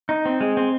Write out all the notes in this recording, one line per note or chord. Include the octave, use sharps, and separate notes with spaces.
D#4
C4
G#3
C4